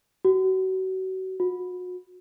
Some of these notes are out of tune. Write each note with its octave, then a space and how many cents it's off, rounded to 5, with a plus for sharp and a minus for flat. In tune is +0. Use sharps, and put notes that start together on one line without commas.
F#4 +30
F#4 -35